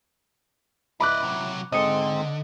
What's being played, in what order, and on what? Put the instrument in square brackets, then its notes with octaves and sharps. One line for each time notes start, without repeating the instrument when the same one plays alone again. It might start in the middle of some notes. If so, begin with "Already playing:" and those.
[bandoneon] E4 [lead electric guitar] D5 D#5 [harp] B5 D6 F#6
[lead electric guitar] C3 F#3
[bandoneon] G#2 G#3 C4 [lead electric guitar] D3 [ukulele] A4 D#5 [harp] D#6 C#7